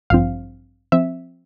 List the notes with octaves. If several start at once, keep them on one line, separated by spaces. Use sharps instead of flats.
A1 G2 F3 C4 F5
F3 C4 E5